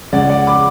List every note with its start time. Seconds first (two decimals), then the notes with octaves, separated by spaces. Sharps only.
0.12 C#2 C#3 G#3 D5 F#5
0.29 D5 F#5
0.47 B5 D6